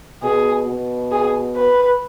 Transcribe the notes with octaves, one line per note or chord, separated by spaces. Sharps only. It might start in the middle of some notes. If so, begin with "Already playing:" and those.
B2 G#4
B2
G#4
B4